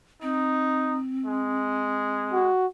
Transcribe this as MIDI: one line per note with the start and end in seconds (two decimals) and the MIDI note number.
0.22 2.37 60
0.22 0.98 63
1.26 2.49 56
2.32 2.67 66